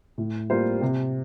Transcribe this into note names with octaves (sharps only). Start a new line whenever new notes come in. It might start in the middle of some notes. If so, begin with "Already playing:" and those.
A2
G3 A#3 F4 C5
C3